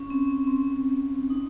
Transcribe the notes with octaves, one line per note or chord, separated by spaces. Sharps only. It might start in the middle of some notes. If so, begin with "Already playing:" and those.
Already playing: C#4
C4
C4
C4
D#4